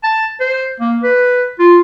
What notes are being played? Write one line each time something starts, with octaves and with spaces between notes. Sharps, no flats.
A5
C5
A#3
B4
F4